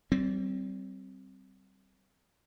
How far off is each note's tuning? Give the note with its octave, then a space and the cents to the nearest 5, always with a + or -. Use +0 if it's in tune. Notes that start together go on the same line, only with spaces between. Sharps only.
G3 -30 C4 +0